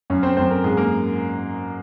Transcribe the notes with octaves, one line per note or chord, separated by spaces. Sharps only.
F#2 C#4 C#5
C4 C5
F#2 C4 C5
A#4
G#2 G#4
A#3 A#4